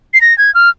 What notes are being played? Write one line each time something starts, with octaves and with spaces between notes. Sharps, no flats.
C7
A#6
G#6
F6